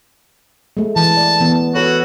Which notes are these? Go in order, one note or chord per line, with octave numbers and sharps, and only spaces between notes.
G#3 A3
E3 A5
D5
E3 B3
F#4 A4 B4 C#5